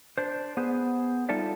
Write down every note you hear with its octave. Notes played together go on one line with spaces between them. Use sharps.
D4 C5
B3 G#4 C5
G3 D#4 F4 A4 D5 E5